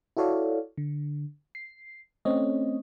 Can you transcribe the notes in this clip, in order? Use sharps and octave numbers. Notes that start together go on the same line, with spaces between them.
E4 F#4 A4 C#5 D5 F5
D3
C7
A3 C4 C#4 C#5 D#5